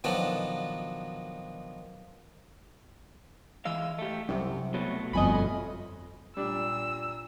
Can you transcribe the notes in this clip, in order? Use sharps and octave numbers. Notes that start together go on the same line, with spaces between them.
B2 D#3 F3 F#3 D4 A4
E3 G#3 F5 E6 D#7
A3 G4
C2 F#2 C3
B2 F#3 A3
G1 F2 D#5 G#5 B5
A#2 G3 D4 E6